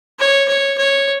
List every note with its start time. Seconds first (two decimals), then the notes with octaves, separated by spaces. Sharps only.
0.19 C#5
0.49 C#5
0.78 C#5